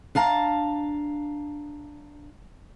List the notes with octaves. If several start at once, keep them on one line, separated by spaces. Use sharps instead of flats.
D4 F5 A5 A#5